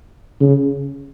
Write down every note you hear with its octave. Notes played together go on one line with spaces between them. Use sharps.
C#3